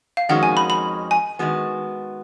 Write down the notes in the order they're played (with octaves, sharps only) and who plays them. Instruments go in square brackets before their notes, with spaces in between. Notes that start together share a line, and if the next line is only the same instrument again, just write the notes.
[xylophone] F5
[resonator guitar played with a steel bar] F2 D#3 G#3 C#4 F#4 [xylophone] F#5
[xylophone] G#5
B5
B5
G#5
[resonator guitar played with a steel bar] D#3 G#3 B3 F#4